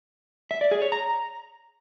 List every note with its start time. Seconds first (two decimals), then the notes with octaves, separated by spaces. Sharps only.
0.51 E5
0.61 D5
0.71 G#4
0.82 C#5
0.92 A#5